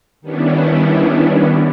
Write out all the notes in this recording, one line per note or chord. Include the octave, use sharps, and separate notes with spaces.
D#3 G3 B3 C#4 D4 E4